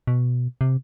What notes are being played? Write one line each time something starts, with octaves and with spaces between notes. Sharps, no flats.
B2
C3